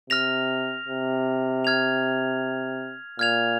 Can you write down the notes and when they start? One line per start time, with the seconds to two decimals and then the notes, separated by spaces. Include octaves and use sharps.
0.10 C3 F6 A#6 F7
0.88 C3
1.65 F6 G#6 F7
3.19 A#2 F6 G#6 F7